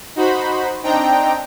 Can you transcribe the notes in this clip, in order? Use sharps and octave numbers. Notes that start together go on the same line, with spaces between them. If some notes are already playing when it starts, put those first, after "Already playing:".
D#4 F#4 C5 B5
C4 D4 D#4 G5 A#5